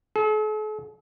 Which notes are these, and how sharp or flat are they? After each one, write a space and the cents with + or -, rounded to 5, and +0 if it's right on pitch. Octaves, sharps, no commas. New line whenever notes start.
A4 -45